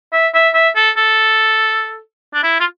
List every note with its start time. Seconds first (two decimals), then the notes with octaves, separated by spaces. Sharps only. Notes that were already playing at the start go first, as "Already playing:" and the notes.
0.13 E5
0.34 E5
0.54 E5
0.76 A4
0.97 A4
2.34 D4
2.43 E4
2.60 F4